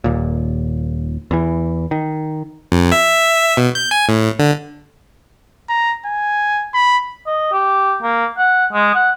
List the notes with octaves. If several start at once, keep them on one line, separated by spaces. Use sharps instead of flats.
D#1 D#2 A#2
E2 E3
D#3
F2
E5
B2
G6
G#5
A2
D3
A#5
G#5
B5
D#5
G4
A#3
F#5
G#3
F#5